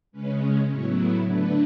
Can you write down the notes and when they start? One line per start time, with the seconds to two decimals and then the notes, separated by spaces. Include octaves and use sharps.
0.12 C#3 G#3 C#4 B4
0.68 A2 F#3 B3 E4 C#5
1.25 D3 A3 D4 B4